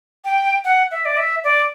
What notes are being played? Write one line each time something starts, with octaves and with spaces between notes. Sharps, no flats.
G5
F#5
E5
D5
E5
D5